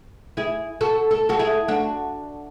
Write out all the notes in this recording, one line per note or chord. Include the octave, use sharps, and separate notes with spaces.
E4 G#4
F#4 A4
A4
F#4 A4
E4 G#4
D4 F#4